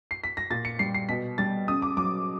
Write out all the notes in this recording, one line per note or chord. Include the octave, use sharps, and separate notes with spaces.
C7
B6
A#6
A#2 A6
C#7
G3 C7
C7
B2 B6
G3 A6
C#3 D#6
D6
F#3 D6